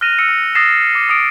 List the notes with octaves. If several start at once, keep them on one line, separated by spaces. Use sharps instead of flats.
F6 F#6 A#6 D#7 F7
E6 C#7
D#6 E6 A6 A#6 C7 E7
D6 C7
D#6 D7